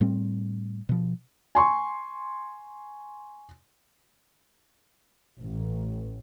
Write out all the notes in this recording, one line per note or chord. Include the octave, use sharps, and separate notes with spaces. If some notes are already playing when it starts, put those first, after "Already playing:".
A2 G3 C4
B2 F3
G#5 C6 C#6
A1